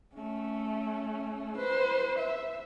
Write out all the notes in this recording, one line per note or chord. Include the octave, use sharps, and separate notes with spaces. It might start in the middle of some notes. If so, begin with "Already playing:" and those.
A3 C#4
B4 C5
E5